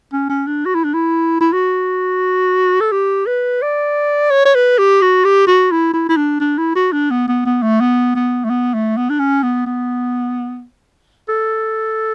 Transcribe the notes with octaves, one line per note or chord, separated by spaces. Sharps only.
C#4
C#4
D4
F#4
E4
D4
E4
E4
F#4
A4
G4
B4
D5
C#5
C#5
B4
G4
F#4
G4
F#4
E4
E4
E4
D4
D4
E4
F#4
D4
B3
B3
B3
A3
B3
B3
A3
B3
A3
B3
D4
C#4
B3
B3
A4